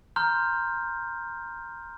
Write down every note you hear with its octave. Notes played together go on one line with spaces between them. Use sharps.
A#5 C6 F6 G6